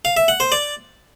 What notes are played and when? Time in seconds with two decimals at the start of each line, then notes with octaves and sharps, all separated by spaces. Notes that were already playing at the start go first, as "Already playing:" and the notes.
0.05 F5
0.17 E5
0.28 F#5
0.40 C5
0.52 D5